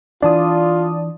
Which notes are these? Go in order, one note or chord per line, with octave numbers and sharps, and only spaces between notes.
E3 D4 F4 D5 A5 D#6